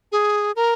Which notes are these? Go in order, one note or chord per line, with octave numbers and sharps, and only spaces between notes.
G#4
A#4